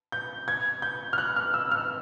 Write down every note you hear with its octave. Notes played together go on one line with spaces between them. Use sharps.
G6
G#6
G6
F6
F#6
F6
E6
F6